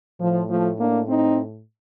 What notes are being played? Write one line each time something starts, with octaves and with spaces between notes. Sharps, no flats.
A2 F3
F3 A3
A#3 D4
C4 D#4